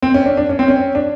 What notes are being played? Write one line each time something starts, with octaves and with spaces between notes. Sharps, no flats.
C4
C#4
D4
D4
C#4
C4
C#4
D4